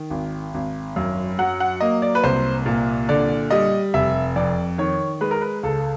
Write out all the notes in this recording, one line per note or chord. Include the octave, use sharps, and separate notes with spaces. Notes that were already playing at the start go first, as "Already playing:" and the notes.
Already playing: D#3
G#1
G#1
F#2
F#3 F#5
F#5
A#3 D#5
D5
B4
C2 C5
A#2
D3 D5
G3 D#5
F1 E5
F2 D5
D#3 C#5
G#3 B4
A#4
B4
C#2 A4